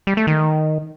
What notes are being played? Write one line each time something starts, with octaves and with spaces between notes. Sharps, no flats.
G3
A3
D#3